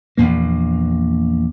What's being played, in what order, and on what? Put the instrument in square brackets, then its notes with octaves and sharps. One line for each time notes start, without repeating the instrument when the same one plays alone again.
[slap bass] A#1 E2 A#3